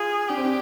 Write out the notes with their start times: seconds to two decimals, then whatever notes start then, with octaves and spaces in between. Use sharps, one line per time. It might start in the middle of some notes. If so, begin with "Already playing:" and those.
Already playing: F4 G#4
0.29 D4 G4
0.37 C4
0.45 D4